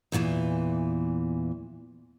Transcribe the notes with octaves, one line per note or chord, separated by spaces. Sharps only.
E2 A#2 D3 E3